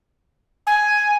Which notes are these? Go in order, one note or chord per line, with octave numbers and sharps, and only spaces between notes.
G#5